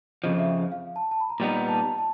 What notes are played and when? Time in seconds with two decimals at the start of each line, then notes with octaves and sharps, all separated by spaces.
0.24 F2 C#3 F3 D#5
0.38 E5
0.72 F5
0.96 A5
1.11 A5
1.20 B5
1.30 A#5
1.40 A#2 G3 B3 D#4
1.69 A5
1.98 A5